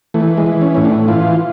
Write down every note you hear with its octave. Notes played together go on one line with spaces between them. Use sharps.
E3 A3
G#3
E3
C#4
A2 C#4
D4
E3 F4